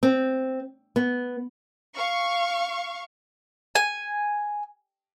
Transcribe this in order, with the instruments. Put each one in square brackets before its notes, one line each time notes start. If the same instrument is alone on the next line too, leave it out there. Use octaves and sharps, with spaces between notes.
[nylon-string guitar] C4
B3
[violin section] F5 C#6
[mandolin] G#5